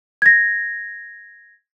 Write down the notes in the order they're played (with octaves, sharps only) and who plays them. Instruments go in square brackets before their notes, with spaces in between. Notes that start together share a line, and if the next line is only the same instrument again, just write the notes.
[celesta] G#6 A#6